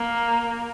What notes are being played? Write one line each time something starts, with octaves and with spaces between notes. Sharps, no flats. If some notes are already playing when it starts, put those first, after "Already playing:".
Already playing: A#3